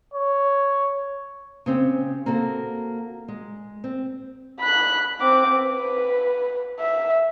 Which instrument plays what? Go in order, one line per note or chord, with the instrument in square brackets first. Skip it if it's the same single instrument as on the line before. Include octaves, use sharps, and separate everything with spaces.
[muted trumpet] C#5
[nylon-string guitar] C#3 C4 G4
A#3 C4 F#4 A4
G#3
C4
[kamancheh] B5 F#6
C4 D6
B4
E5